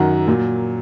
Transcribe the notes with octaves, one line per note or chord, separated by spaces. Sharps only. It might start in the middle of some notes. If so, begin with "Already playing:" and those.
Already playing: F#2 D#3 F#3 F#5
A#2 F#3